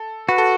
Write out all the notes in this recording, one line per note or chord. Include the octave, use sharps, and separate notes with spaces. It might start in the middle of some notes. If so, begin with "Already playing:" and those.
Already playing: A4
F#4 B4
A4